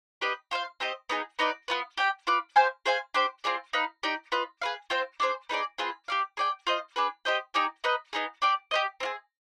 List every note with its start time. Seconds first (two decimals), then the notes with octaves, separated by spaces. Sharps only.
0.21 D4 G4 B4 D#5
0.51 F4 C5 F5
0.80 C4 G4 C5 D#5
1.09 B3 D#4 G#4
1.39 B3 D#4 B4 D5
1.68 B3 F4 B4
1.97 G4 D5 G5
2.27 F4 B4 D5
2.56 G4 C5 F5 G#5
2.86 G#4 C5 F5 G#5
3.14 D4 G4 C5
3.44 C4 F4 G#4 D5
3.73 D#4 B4 F5
4.03 D#4 G4 D5
4.32 F4 B4 D#5
4.62 G#4 B4 F5
4.90 C4 F4 C5 G5
5.20 D4 G#4 C5
5.49 B3 D#4 G#4 D5
5.78 C4 F4 G#4 B4
6.08 G4 D5 F5
6.37 G#4 D5 G5
6.67 F4 C5 D#5
6.96 D4 G#4 B4
7.25 G4 C5 D#5 G5
7.54 D#4 G4 D5 G#5
7.84 D#4 B4 D#5
8.13 B3 D#4 G#4
8.42 D4 G4 D5
8.71 G4 C5 D#5
9.00 C4 F4 G#4